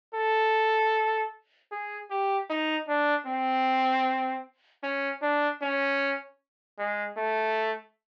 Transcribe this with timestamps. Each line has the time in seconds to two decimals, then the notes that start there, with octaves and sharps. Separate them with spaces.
0.15 A4
1.72 G#4
2.11 G4
2.50 D#4
2.88 D4
3.27 C4
4.83 C#4
5.22 D4
5.62 C#4
6.79 G#3
7.17 A3